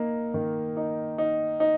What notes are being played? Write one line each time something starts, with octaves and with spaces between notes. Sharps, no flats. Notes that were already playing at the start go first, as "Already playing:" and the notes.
Already playing: A#3 D#4
D#3
D#4
D#4
D#4